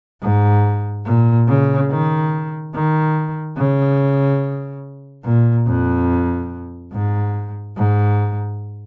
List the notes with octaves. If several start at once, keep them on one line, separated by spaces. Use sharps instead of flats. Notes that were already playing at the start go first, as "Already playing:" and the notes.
G#2
A#2
C#3
D#3
D#3
C#3
A#2
F2
G#2
G#2